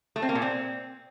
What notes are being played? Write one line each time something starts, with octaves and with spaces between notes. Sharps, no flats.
A3
C4
A#3
A#2
C4